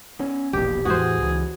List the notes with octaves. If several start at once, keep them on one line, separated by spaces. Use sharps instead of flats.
B3 C#4
E1 A#1 B2 G4
E2 A2 E3 F#4 G#4 C5
C#2 E3